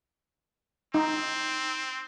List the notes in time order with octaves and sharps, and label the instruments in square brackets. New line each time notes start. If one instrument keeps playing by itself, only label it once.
[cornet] C4 [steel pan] D#4